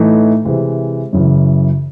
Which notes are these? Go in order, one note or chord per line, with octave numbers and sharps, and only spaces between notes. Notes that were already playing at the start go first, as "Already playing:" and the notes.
Already playing: A2 E3 A3 D#4
C3 E3 G#3
F#2 C#3 E3